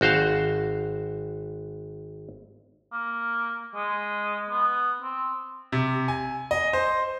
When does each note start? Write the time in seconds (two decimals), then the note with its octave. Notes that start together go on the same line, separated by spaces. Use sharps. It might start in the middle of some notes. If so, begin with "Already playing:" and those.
0.01 G#1 F#4 C5 F5 A5
2.93 A#3
3.75 G#3
4.50 B3
5.02 C4
5.72 C3
6.08 G#5
6.51 D#5
6.73 C5